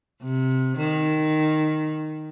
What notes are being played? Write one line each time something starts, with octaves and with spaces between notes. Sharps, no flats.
C3
D#3